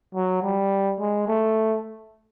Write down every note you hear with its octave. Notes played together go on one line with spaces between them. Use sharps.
F#3
G3
G#3
A3